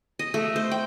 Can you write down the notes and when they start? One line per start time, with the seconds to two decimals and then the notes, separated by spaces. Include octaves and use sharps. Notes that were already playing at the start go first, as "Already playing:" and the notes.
0.19 D#5
0.34 A3
0.56 C5
0.71 G5